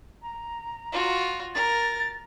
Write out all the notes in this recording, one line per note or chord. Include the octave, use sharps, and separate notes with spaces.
A#5
F4 F#4
A#4 A6